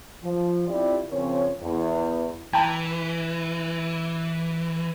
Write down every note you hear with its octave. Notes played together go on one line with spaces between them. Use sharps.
F3
C4 E4 F4 G4 D5
C#3 F3 C4 C#4 A#4 C#5
E2
E3 G5 A5 A#5